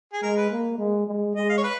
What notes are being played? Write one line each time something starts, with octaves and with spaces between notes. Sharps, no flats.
G#4
G#3 A#4
B4
A#3
G#3
G#3
G#3 D#5
F5
C#5
B4